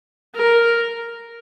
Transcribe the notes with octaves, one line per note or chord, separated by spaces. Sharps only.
A#4